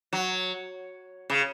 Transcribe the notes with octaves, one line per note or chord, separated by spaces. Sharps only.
F#3
C#3